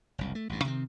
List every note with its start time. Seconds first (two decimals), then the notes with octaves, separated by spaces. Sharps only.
0.18 F#1 C2
0.35 A3
0.49 A1 G2
0.65 C3 D#3 C4